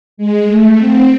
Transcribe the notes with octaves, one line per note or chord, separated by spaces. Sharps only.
G#3
A3
C4